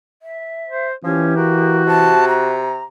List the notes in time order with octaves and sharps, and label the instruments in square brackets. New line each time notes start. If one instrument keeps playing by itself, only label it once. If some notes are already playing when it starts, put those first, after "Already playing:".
[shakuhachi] E5
[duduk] C5
[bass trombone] E3 [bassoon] F3 [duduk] C#4 [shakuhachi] G4
[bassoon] A#3 [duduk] F#4
[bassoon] C3 [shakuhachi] A5
[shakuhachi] A#5